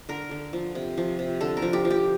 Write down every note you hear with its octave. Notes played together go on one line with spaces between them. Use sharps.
D3 A#4
D3
F3
C3
F3
C3
D3 A4
A#4
F3
G4
F3
G4